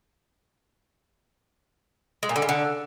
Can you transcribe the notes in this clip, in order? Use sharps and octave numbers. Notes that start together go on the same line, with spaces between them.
G#3
A#2
D3
C#3
D3